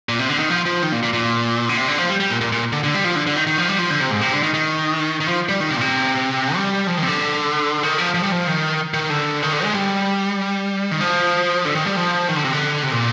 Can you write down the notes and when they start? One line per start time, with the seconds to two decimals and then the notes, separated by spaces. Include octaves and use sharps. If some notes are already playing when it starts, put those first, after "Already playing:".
0.09 A#2
0.19 C3
0.30 D3
0.39 D#3
0.50 F3
0.65 F3
0.82 D#3
0.92 A#2
1.03 A#2
1.13 A#2
1.69 D3
1.77 C3
1.88 D3
1.98 F3
2.09 G3
2.20 G3
2.31 A#2
2.41 A#2
2.52 A#2
2.72 D3
2.84 D3
2.94 G3
3.04 F3
3.16 D3
3.27 D3
3.36 D#3
3.47 D#3
3.58 F3
3.68 G3
3.79 F3
3.90 D3
4.00 C3
4.11 G#2
4.21 C3
4.32 D3
4.43 D#3
4.54 D#3
5.20 D#3
5.28 F3
5.49 G3
5.60 D#3
5.71 C3
5.77 A#2
5.81 C3
6.55 G3
6.87 F3
6.97 D#3
7.03 C3
7.08 D3
7.83 D#3
7.98 F3
8.14 F3
8.23 G3
8.32 F3
8.47 D#3
8.94 D#3
9.10 D3
9.42 D#3
9.53 D3
9.63 G#3
9.74 G3
10.91 D#3
11.01 F3
11.65 D3
11.75 D#3
11.86 G3
11.96 F3
12.29 D#3
12.36 D3
12.45 C3
12.53 D3
12.83 C3
12.92 A#2